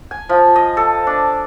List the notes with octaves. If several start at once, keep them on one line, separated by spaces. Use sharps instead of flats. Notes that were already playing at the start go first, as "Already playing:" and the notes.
G#5
F3
D#5
A4
D4